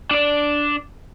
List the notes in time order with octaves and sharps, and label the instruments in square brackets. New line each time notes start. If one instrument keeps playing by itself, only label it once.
[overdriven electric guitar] D4 D5